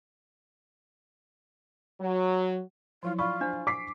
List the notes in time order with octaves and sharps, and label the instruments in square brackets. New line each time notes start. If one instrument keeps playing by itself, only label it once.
[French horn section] F#3
[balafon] F3 F#3 E4 [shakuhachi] F4
[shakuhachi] F4 [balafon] D5 [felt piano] B5 [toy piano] C#6
[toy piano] D4 [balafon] C5 F5
[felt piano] D6 B6 C7